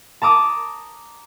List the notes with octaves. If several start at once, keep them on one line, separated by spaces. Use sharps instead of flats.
A5 A#5 D6 D#6